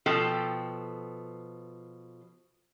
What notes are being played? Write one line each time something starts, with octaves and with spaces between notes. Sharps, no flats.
B2 F3 A4 G5